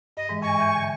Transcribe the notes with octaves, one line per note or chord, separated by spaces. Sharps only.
G2 D#5
G#2 E3 G#3
G#5 C#6
E5 G6
D3